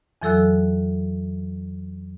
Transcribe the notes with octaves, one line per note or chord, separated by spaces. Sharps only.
F2 E3 F#3 A4 E6 F#6